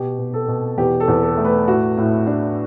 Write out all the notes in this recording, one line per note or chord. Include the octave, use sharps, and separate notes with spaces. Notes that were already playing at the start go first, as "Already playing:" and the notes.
Already playing: B2 G4
B2
A4
B2
E2 G4
A4
E2
A4
A3
B4
A2 F#4
A2 E4
A2 D4